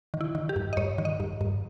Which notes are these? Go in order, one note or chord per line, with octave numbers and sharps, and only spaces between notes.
D#3
E4
D#3
G4
G2
D#5
G2 C#5
D#3
D#5
G2
G2